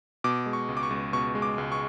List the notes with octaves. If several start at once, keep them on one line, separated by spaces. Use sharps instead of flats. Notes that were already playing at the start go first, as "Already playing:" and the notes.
B2 D6
G#3
C#6
C#2
D6
C#6
C#2
B2 C#6
G#3
D6
C#2
C#6